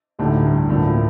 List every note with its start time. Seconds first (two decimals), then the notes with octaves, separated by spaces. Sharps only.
0.19 D2 A2 D3 A3 D#4 G4
0.45 G2
0.69 D2 A2 D3 F3 A#3
0.87 A2